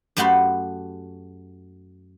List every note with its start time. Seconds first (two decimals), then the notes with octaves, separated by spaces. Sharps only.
0.17 F#2 A3 F#4 G4 B5 C6